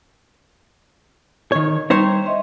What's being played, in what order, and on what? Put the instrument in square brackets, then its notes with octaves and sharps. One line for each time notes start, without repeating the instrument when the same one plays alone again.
[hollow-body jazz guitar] D#3 C#5
[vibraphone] G3 [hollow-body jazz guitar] D#4 C5 C#5
[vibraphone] D#5 E5 C6